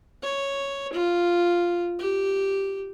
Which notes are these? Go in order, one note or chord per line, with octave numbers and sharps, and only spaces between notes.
C#5
F4
G4